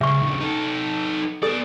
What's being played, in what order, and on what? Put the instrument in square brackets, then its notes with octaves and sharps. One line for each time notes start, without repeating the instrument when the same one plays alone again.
[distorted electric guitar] C#2 [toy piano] E5 C#6
[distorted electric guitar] D#2 C#3
D#4 A4
[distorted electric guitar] B3 D5 [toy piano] A4